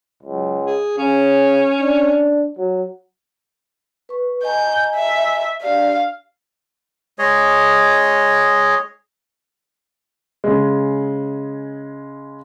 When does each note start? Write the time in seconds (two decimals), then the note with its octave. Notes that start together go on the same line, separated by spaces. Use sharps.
0.23 C#2 F#3
0.66 G#4
0.98 C#3 C#4
1.80 D4
2.58 F#3
4.09 B4 C#6
4.43 D#5 G#5 A#5 G6
4.94 E5
5.62 D4 G4 D5 F5
7.19 G#3 G#4 C#5 D#5
10.44 C#3 G#3